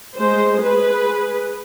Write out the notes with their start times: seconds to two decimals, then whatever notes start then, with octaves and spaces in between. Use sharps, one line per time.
0.15 G#3 C5
0.58 G#4 B4